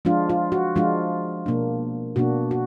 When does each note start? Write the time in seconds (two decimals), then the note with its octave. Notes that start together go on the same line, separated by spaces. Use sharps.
0.05 F3 G#3 D4 F4
0.29 F4
0.52 F#4
0.76 F3 G#3 D4 F4
1.46 B2 A#3 D4
2.16 B2 A#3 D4 F#4
2.51 F#4